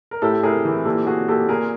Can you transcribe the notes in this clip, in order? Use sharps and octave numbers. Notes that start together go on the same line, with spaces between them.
A#4
A2 G4 A4
A2 G#4 A#4
E3
A#2 G4 A4
A#2 F#4 G#4
A#2 G4 A4
A#2 G#4 A#4